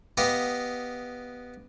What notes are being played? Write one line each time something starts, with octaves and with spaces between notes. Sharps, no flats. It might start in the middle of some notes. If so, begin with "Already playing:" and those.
B3 G4 D#5 F5